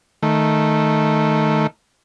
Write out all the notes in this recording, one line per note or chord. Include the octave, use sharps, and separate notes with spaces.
D#3 A3